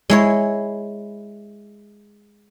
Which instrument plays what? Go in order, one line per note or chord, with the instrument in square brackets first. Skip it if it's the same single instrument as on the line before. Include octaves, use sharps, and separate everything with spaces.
[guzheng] G#3 E4 C#5